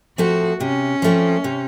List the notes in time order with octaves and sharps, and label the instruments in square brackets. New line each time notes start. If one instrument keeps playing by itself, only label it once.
[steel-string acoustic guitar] F3 A3 C4 [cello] F#4
[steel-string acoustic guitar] C3 [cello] C#4
[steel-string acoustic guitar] F3 A3 C4
C3